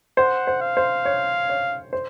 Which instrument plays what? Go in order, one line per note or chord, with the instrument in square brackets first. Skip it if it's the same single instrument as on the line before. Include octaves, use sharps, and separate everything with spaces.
[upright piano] C5 [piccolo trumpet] F#5
[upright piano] C5
[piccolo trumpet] F5
[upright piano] C5
C#5
C#5
C5